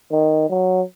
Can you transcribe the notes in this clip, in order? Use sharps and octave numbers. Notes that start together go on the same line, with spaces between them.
D#3
F#3